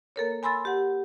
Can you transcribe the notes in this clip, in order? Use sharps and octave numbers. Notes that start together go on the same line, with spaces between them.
A#3 A4 A#4 C#5
G#5 B5 C6 E6 A6
G4 F#5